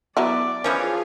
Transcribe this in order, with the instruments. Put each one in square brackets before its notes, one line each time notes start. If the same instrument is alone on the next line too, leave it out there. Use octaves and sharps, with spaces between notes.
[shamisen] F#3 B3 E4 [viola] D5
[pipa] E3 F3 C#4 [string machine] F4 G#4 F5